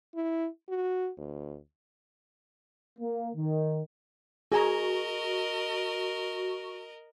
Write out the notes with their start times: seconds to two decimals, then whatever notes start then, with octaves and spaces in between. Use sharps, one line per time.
0.15 E4
0.68 F#4
1.18 D2
2.99 A#3
3.35 D#3
4.52 F#4 G#4 A#4 D#5 G#5 A#5